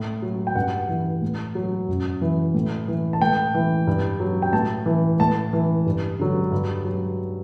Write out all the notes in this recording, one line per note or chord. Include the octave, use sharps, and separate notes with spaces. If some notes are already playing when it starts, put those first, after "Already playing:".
Already playing: A2
F#3
G5
G2 F#5
E3
A2
F#3
F#2
E3
A2
E3
A5
A2 G5
E3
G2
F#3
G5
A2 A5
E3
A2 A5
E3
G2
D3 F#3
G2
F#3